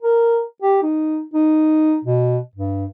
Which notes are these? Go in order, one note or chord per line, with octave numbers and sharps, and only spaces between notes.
A#4
G4
D#4
D#4
B2
G2